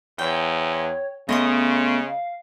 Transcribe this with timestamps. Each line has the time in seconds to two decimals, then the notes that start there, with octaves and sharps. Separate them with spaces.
0.19 E2 C#5 G5
1.29 C#3 A3 B3 C#4 D#5 C6 C#6 D#6
2.07 F5